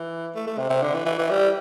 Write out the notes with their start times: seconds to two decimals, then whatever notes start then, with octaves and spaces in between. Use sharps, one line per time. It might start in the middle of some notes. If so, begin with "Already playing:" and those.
Already playing: E3
0.35 A3
0.47 A3
0.58 C3
0.70 C3
0.83 D3
0.94 E3
1.05 E3
1.18 E3
1.30 G3